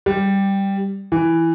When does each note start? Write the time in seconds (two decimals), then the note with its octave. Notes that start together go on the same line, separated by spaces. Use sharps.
0.06 G3
1.12 E3